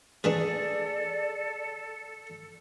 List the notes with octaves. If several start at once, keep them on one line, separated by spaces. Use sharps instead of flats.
E3 A3 D4 G#4 A4 D5